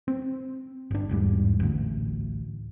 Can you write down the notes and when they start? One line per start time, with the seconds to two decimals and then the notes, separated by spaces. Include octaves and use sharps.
0.08 C4
0.91 G1 D4
1.09 G1 E2 G#2 G3
1.60 A1 D2